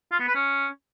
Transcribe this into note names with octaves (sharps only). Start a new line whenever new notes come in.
F4
B3
B4
C#4